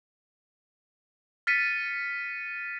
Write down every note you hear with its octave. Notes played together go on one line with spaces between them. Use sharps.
F6 A6 B6 C#7 D#7